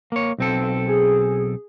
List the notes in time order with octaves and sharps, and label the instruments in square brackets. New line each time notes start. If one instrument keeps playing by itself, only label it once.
[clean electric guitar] A#3 C#5
B1 C4 A4
[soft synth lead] G#4